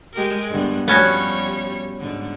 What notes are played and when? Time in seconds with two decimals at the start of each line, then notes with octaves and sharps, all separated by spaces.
0.14 G#3 G4 A#4
0.50 G2 D3 B3
0.88 F3 G3 B3 C#4 F#4 C#5
2.00 G#2 D3